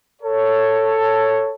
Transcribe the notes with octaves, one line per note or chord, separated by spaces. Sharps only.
A4 C#5